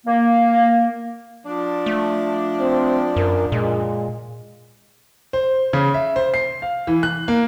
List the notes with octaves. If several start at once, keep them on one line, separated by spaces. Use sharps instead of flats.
A#3
F3 D4
A3
C4
F#2 A#4
A#2 G#3
C5
C#3
E5
C5
C7
F5
E3
F#6
A#3